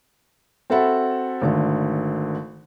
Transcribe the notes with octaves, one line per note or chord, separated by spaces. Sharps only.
C4 F#4 A4 E5 F#5 B5
G#1 D3 A3